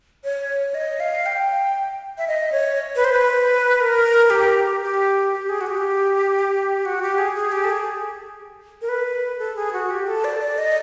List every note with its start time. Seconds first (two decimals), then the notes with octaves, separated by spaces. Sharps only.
0.24 C#5
0.74 D#5
1.00 F5
1.26 G5
2.18 E5
2.28 D#5
2.52 C#5
2.96 B4
3.04 C5
3.12 B4
3.80 A#4
4.30 G4
4.82 G4
5.33 G4
5.49 G#4
5.61 F#4
5.66 G4
6.85 F#4
7.02 G4
7.18 G#4
7.36 G#4
7.52 G4
7.64 A4
7.70 G#4
8.81 A#4
8.89 B4
9.38 A4
9.56 G#4
9.73 F#4
9.90 G4
10.07 A4
10.24 D5
10.40 D5
10.58 D#5